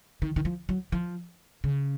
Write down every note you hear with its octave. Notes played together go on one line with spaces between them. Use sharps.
D#3
D#3
F3
F#3
F3
C#3